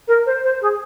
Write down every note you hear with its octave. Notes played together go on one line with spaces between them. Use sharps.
A#4
C5
C5
G#4